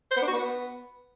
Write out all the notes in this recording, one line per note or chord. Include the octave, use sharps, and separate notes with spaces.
C5
B3
D4
F#4
B3